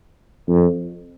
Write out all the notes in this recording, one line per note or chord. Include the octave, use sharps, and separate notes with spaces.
F2